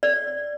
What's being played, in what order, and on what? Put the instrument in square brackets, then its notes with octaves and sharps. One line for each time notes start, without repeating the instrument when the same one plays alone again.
[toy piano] D5